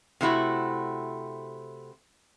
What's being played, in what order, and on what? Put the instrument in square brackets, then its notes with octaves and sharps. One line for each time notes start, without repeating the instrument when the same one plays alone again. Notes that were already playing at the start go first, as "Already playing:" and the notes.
[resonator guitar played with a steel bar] C3 A3 E4 F#4